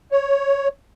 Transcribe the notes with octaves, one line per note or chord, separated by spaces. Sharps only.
C#5